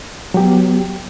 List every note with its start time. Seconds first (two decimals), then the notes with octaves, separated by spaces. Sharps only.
0.34 F#3
0.37 G4
0.40 B3